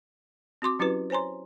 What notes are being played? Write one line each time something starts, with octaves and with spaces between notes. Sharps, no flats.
C4 F#4 C6 D6
F#3 C#4 E4 F#4 G4 B4
C5 C#5 G#5 A#5 C6